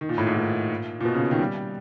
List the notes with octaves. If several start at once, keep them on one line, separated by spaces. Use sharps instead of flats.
D#3
A#2
A2
G#2
A#2
A#2
B2
C#3
D#3
G3